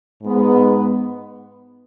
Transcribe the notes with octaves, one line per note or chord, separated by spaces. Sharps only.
G#2 G#3 B3